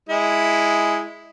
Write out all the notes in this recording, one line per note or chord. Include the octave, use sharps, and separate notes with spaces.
G#3 E4